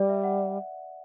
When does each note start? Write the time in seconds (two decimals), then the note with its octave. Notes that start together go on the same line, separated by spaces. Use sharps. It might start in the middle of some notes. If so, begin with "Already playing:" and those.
Already playing: G3 D5
0.09 E5
0.24 F#5